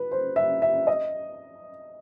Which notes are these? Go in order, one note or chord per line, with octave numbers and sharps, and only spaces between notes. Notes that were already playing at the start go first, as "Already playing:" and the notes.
Already playing: B4
C5
E5
E5
D#5